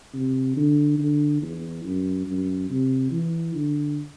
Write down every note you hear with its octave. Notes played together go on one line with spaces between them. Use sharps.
C3
D3
D3
E2
F#2
F#2
C3
E3
D3